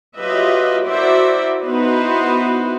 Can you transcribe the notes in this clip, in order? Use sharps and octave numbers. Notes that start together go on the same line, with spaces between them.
F#3 F4 G4 B4 D#5 E5
E4 F#4 A#4 C5 D5 E5
B3 D#4 E4 F#4 B4 C5